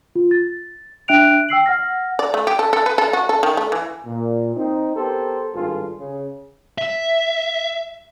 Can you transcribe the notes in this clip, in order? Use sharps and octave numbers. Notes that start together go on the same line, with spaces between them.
F4
A6
D4 E5 G5 F#6 D7 F7
G5 E6 C7 F#7
F#5 F6 A#6
D5
A3
G4
A4
A4
B4
A4
F#4
A4
D#3
A3
E3
A#2
C4 D#4
B3 G4 A4 A#4 C5
G#1 G2 F4 G#4 A4
C#3
E5